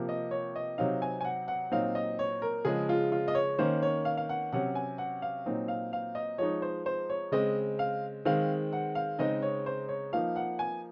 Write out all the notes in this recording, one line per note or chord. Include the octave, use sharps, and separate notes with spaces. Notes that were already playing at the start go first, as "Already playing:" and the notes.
Already playing: C3 F3 A#3
D#5
C#5
D#5
C3 F#3 C4 D#4 F5
G#5
G#5
F#5
F#5
A#2 F#3 C4 D#4 F5
D#5
C#5
A#4
C#3 F3 G#3 G#4
F4
F4
D#5
C#5
D#3 A#3 C#4 C5
C#5
F5
F5
F#5
C3 F#3 C#4 F#5
G#5
F#5
F5
A#2 F#3 C4 D#4
F5
F5
D#5
F3 G#3 D#4 C#5
C5
C5
C#5
C#3 G#3 C4 D#5
F5
D#3 G#3 C4 F5
F#5
F5
C#3 G#3 C4 D#4 D#5
C#5
C5
C#5
F3 A#3 D#4 F5
F#5
G#5